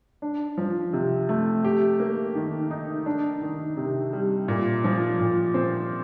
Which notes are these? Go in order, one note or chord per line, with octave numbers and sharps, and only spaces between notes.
D4
F3
C3
A3
G4
A#3
D#3
D#4
D4
D#3
C3
G3
A#2
F3
A#2
C4